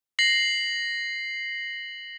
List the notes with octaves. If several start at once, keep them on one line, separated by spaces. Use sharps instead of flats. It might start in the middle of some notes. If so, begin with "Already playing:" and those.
A#6 C7 F#7